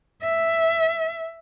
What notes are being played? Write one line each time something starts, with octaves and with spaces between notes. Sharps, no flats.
E5